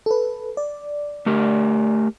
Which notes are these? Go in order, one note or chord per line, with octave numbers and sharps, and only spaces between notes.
A4 B4
D5
A3 G4 A#4